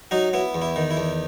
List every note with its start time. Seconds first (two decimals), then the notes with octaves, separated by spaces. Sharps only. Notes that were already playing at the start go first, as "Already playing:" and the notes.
0.11 F#3 D#4 F#4
0.33 B3 E4
0.54 E2
0.62 E4
0.76 D#3
0.91 E4
0.97 E2